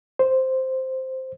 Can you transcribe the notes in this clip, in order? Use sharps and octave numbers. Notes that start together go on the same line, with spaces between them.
C5